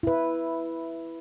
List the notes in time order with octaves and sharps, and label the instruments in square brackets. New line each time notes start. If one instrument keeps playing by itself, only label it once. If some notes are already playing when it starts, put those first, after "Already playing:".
[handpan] E4 B4